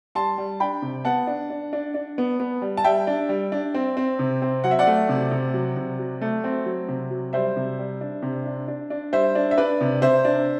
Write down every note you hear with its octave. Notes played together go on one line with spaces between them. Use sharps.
G3 A5 C6
G3
D4 G5 B5
C3
B3 F#5 A5
D4
D4
D4
D4
B3
B3
G3
A5
G3 E5 G5
D4
G3
D4
C4
C4
C3
C4
F#3 F#5
E5
D5 F#5
A3
C3
C3
F#3
C3
F#3
A3
C4
F#3
C3
F#3
G3 C5 E5
C3
G3
D4
C3
D4
D4
D4
G3 C5 E5
D4
E5
D4 B4 D5
C3
C3 C5 E5
D4